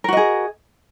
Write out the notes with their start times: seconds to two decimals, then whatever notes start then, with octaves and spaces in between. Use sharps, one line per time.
0.04 A#4
0.08 F#4
0.13 D#5
0.17 G#4